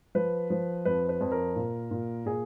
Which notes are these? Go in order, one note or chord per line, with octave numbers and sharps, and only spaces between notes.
F3 B4
F3
F2 B4
B4
F2
A#4
A#2
A#2
A#2 G#4